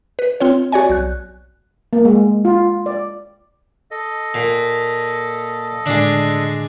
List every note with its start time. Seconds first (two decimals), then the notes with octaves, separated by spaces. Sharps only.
0.19 B4
0.40 C4 F4 C#5
0.72 F#4 C#5 D5 G#5
0.89 B1 F#6
1.93 A#3
2.05 G#3
2.45 F4
2.86 D5
3.91 A4 D#5
4.34 A#2
5.86 A2 D3 G#3 D4